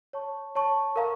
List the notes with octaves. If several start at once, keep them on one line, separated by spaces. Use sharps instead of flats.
C#5 A5 C#6
C#5 A5 C#6
A#4 F5 A#5 C#6